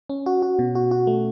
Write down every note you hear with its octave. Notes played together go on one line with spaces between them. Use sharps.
C#4
F#4
F#4
B2
F#4
F#4
A3